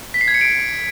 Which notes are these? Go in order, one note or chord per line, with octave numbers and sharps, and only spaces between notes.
B6
C7
G#6
C#7
D7